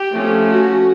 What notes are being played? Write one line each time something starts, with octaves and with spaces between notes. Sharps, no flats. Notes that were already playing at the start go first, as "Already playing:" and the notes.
Already playing: G4
F3 A3 C#4
F#4